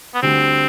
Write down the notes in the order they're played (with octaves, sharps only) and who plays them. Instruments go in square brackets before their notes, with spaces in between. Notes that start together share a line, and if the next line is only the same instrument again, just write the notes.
[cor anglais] B3
[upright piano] D2 D3 G3 [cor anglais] C4